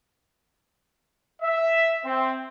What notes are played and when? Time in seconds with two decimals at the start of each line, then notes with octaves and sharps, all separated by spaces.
1.42 E5
2.04 C4